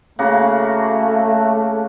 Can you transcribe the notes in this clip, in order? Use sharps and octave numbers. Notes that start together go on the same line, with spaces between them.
C#3 A3 A#3 F#4